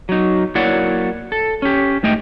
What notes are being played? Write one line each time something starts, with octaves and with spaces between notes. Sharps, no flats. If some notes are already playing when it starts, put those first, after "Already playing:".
F#3 D#4
F#3 A#3 E4 C#5 D5 F#5
A4
C#4 G4
G#2 A3 D#5 G5